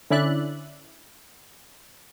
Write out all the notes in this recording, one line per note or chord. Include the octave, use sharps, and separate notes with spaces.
D3 C#4 E4 D5 E5 F#6